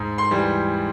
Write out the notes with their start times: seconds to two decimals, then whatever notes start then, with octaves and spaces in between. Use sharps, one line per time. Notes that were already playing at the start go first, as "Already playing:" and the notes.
Already playing: G#2
0.18 C6
0.31 E3 G3